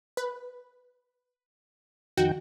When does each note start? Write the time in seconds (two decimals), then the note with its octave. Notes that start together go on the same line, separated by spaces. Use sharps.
0.17 B4
2.17 F2 D#3 F#4 G5